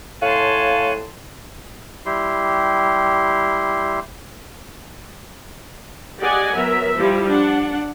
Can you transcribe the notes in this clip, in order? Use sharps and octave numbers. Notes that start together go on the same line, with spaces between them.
A2 C#5 F5 G#5 A5 C6 F#6
G3 E4 G4 C6
G4 G#4 D5 D#5 F#5 G#5
F#3 B3 A#4 E5
F3 G3 E4
D4 F#5